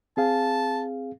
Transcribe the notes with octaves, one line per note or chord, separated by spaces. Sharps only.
C4 G#4 F5 A5